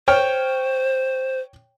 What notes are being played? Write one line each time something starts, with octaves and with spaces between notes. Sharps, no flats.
C5 C#5 G5 F6